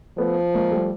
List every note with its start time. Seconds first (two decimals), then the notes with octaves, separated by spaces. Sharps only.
0.17 F3 A3 B3
0.54 G#3 A#3
0.71 G3 A3